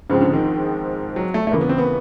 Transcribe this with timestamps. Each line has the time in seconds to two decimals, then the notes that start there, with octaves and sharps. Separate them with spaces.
0.10 G#2 C#3 F3 G#3 C4
0.21 D3
0.33 D#3
1.16 F#3
1.34 A3
1.47 A3
1.51 D#2 C#3 E3 A#3
1.61 B3
1.69 C4
1.78 B3